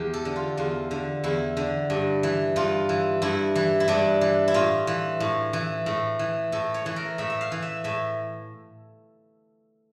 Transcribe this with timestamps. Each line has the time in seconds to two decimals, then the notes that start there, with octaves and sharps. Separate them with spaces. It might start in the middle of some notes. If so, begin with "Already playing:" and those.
Already playing: E2 G4
0.14 A4
0.25 D3
0.36 F4
0.57 E2 F4
0.91 D3
1.24 E2 E4
1.57 D3
1.90 G2
2.23 E3
2.56 G2 F4
2.89 E3
3.22 G2 E4
3.55 E3
3.80 E4
3.88 G2 D4
4.21 E3
4.48 E4
4.54 A2 F4
4.87 E3
5.20 A2
5.53 E3
5.86 A2
6.19 E3
6.52 A2 A4
6.74 C#5
6.86 E3
6.96 A#4
7.18 A2 E5
7.30 E5
7.41 F5
7.52 E3
7.62 E5
7.84 A2 E5